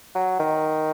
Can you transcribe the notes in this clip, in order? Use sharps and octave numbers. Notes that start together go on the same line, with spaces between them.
F#3
D#3